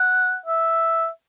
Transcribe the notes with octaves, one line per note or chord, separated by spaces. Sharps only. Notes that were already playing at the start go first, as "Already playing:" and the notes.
Already playing: F#5
E5